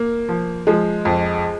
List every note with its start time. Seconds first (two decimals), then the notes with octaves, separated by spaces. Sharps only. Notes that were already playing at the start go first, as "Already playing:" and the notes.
Already playing: A#3
0.29 F3
0.67 F3 G#3
1.05 F2